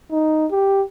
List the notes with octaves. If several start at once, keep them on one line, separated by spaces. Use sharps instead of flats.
D#4
G4